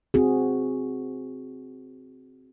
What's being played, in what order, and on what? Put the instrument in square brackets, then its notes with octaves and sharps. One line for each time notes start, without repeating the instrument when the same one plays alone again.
[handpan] C4 F#4 G#4